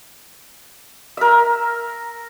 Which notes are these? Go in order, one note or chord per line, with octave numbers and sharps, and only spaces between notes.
A#4 E5